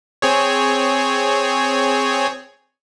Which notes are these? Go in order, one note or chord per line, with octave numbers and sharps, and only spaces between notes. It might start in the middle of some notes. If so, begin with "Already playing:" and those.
C4 G#4 C#5